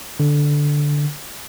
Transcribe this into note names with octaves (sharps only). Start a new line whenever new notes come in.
D3